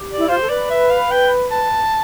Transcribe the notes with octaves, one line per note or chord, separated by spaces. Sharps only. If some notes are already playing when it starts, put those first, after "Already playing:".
Already playing: G4
D5
E4
F4
C5
G4
A4
B4 D5
E5
F5
G5
A5